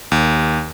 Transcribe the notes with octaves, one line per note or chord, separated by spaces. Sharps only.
D#2